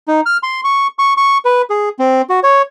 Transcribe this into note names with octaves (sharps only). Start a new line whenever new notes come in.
D#4
F6
C6
C#6
C#6
C#6
B4
G#4
C4
F#4
C#5